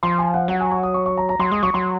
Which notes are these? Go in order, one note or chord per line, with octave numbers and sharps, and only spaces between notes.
F3 C6
G#5
F#5
F#3 F#5
G#5
C#6
D#6
C#6
C#6
A#5
A#5
F#3 C6
G#3 D#6
F#3 C#6
F#3 C6